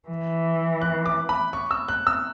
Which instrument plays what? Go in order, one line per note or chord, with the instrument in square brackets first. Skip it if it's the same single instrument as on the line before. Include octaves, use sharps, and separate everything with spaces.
[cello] E3
[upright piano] F#6
D6
B5
C#6
E6
F#6
E6